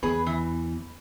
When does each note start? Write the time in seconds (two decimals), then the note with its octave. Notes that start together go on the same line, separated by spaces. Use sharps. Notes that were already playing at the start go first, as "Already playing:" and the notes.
0.03 E2 G#4 B4
0.26 E3